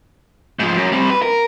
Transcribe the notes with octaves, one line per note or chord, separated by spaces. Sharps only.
G#2 F3
F#2
G3 C4
B4
A#4